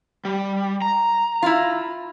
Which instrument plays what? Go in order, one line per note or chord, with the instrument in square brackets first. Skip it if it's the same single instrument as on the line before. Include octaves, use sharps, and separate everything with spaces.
[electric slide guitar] G3
A#5
[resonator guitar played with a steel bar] E4 F4